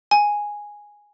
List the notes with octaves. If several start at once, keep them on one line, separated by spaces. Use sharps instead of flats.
G#5